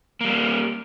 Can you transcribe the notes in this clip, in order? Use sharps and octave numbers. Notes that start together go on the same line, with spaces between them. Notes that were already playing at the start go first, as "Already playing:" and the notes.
G3 A#3